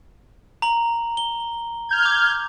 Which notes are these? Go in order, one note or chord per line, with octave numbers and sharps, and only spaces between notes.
A#5 F#7
G7
F6 G6 G#6
D6